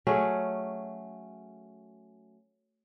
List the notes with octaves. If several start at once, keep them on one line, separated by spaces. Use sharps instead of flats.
F#3 A3 C#4 G#4